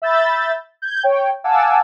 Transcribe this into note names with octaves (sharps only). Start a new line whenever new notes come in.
E5 B5 E6 G6 A6
G6 G#6
C#5 G5
F5 F#5 G#5 A5 D6 E6